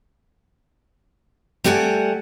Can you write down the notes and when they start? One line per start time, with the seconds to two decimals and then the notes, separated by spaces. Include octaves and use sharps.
1.64 G3 A3 G4 F#5 G#5